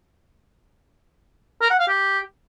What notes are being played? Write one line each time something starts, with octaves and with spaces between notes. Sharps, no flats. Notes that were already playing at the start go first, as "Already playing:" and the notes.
A#4
F#5
F5
G4